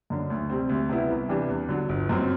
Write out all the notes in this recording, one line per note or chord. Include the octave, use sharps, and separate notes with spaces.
F#2 D3
D2
C3 G3 C4
D2
C3 G3 B3 E4
C2
C3 E3 G3 D4
E2
D3 F#3
G1
F#2 F#3 C4